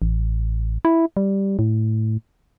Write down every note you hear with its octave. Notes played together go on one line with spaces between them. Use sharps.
A1
E4
G3
A2